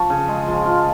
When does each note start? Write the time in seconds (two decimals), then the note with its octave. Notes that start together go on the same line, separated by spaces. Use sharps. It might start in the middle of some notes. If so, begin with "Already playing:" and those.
Already playing: F3 C#6
0.10 C#3
0.28 G#3
0.48 F3
0.66 F4